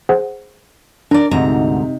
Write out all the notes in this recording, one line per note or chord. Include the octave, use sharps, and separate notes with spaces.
G#4 C5 F#5
D4 A#4 D5
D2 G#2 C3 D#4 A#5